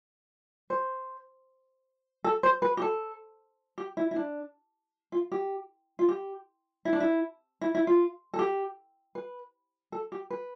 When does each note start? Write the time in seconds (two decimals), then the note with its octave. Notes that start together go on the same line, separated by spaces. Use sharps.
0.70 C5
2.24 A4
2.43 C5
2.62 B4
2.77 G4
2.82 A4
3.78 G4
3.97 E4
4.11 E4
4.16 D4
5.12 F4
5.32 G4
5.99 F4
6.09 G4
6.85 E4
6.93 D4
7.00 E4
7.61 E4
7.75 E4
7.87 F4
8.34 A4
8.39 G4
9.15 B4
9.92 A4
10.12 G4
10.30 B4